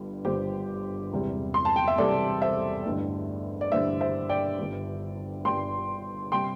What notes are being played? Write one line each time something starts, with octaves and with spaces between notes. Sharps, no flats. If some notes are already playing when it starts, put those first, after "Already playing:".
Already playing: G1 G2 D3 G3
G1 G2 D3 G3 G4 C5
E1 E2 C3 G3
C6
A5
G5
E5
E1 E2 C3 G3 A4 D5
C5 E5
A1 G2 D3 G3
D5
A1 G2 D3 G3 C5 E5
C5 E5
D5 G5
G1 G2 D3 G3
G1 G2 D3 G3 G5 C6
C3 G3 G5 C6